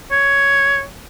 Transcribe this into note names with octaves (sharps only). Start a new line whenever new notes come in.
C#5